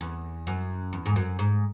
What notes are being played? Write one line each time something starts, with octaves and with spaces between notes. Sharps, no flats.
E2
F#2
E2
G#2
F#2
G#2